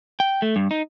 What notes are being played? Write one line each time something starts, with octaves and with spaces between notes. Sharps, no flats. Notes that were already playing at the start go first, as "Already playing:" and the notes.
G5
A3
G2
D#4